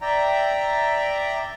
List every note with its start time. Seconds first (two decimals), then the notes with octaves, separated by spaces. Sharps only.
0.01 D5 E5 G5 A#5